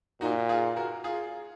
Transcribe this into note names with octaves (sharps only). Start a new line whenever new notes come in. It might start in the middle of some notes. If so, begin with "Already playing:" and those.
A#2 D#4 F#4
F4 G#4
F#4 A#4
F4 G#4